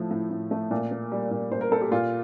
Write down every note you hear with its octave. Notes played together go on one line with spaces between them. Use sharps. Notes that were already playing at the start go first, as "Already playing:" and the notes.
Already playing: A2 F3 A3
A2
A2
A3
A#2
A#3
G3
A#2
A#2 C5
A#4
A#3 A4
G4
A#2 F4